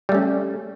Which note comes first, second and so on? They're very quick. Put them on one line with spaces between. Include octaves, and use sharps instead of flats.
G3 A3 C#4